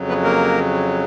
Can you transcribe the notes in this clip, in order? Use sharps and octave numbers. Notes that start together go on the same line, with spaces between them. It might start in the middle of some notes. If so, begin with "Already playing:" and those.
Already playing: F2 C#3 F#3
B3 B4
A#3 A#4